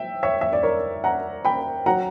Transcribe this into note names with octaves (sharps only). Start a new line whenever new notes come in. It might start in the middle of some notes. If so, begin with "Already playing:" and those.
Already playing: E5 G5
C#5 E5
E5
D5
A#4 C#5
F#5 A#5
G5 B5
F#3 F#5 A#5